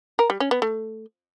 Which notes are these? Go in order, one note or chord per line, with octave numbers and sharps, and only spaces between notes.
A#4
G3
C#4
B3
A3